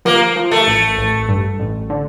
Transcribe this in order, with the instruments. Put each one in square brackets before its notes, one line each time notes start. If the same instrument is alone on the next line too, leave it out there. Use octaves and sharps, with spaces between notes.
[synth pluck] F3 [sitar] A#3
[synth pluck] F3
[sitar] A3
[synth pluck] A1
A1
G2
A1
D3